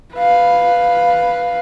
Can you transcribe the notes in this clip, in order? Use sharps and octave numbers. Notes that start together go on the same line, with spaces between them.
B4 F5